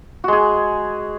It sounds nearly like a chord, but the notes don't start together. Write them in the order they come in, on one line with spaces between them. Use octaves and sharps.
F#4 G#3 G#4